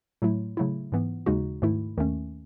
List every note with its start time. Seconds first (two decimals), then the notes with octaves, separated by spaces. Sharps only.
0.22 A2 F#3 A3 E4
0.57 C#3 F#3 A3 E4
0.92 G#2 E3 B3
1.26 D#2 C#3 G#3 D#4 F#4
1.62 G#2 D#3 A3 E4
1.97 D#2 D#3 A3 C#4